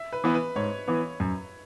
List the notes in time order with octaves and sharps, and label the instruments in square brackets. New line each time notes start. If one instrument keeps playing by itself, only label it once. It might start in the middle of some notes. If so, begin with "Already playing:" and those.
Already playing: [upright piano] E5
B4
[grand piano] E3 B3
[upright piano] B4
[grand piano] G#2 [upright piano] C#5
[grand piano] E3 B3
F#2